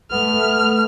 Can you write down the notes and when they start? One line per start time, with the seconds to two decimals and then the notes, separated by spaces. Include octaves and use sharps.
0.11 A3 B3 F6